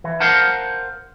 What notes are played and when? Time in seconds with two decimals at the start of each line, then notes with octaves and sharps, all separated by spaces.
0.04 E3
0.20 A#4 C5 F5 F#5 A5